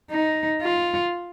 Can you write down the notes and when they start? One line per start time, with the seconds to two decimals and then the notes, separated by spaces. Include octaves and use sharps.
0.11 D#4
0.62 F4